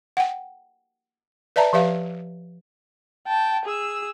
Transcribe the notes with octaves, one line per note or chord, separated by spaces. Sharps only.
F#5 G5
B4 D5 E5 A5 A#5
F3 G4 B4 E5 F5
G5 A5
G#4 E6